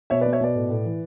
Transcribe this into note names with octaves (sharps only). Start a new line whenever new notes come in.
B2 C#5 E5
B4 D5
B2
C#5 E5
B2 B4 D5
A2
A2
E3